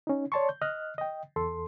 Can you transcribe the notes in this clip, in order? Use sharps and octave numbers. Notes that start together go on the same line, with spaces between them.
C#4 D#4
C#5 D5 A5 C6 C#6
G6
D#5 F6 F#6
D#5 G5
E2 A4 C6